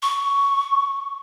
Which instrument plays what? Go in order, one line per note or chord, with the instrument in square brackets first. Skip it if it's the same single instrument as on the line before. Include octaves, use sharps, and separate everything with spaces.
[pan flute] C#6